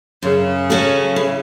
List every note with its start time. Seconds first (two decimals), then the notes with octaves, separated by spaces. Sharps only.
0.23 F#2 C#3
0.70 F#3 C#4 F#4 A4
1.16 E3